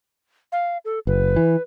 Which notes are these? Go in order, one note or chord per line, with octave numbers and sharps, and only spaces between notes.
F5
A4
F#1 B4
E3